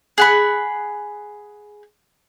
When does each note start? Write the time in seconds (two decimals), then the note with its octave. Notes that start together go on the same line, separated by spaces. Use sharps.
0.18 G#4 F#5 B5